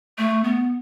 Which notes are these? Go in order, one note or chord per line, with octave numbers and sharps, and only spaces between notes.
A3
B3